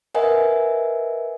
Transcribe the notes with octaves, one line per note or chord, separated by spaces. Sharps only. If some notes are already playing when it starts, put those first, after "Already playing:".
A#4 B4 D#5 E5 F#5 G#5